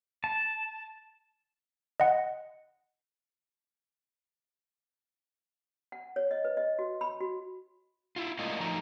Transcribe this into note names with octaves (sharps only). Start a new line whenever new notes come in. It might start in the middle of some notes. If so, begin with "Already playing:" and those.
A5
D#5 F#5
F#5
C#5
D#5
B4
D#5
F#4
B5
F#4
E4 F4
A2 G#3 A#3 F4 D5 D#5
F3 F#3 A3 D#4 A#5